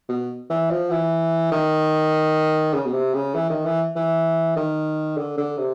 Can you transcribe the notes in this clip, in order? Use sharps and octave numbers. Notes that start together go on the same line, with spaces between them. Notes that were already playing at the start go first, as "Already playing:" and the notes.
B2
E3
F3
E3
D#3
C#3
B2
C3
C#3
E3
D#3
E3
E3
D#3
D3
D3
C3